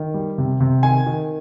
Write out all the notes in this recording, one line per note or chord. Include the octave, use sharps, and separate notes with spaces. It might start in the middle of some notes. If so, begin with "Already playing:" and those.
Already playing: D#3
G3
C3
C3
D#3 G#5
D#3